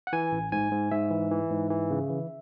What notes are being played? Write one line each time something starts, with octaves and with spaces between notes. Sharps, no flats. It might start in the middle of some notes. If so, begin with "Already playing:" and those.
F#5
E3 G#5
A1
G#2 G#5
G#2
G#2 E5
E3
E3
G#2
E3
C#3
E3